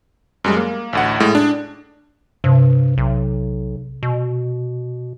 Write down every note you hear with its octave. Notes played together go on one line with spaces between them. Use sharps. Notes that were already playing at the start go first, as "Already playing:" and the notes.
F#2 G3 G#3
A#3
A1 D2 F#5
A2 G#3
D4
G2 C3
B1
B2